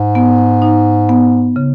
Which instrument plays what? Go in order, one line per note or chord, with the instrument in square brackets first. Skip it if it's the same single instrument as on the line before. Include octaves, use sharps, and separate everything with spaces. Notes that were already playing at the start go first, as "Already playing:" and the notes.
Already playing: [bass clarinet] G#2
[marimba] B3
D#4
B3
C#3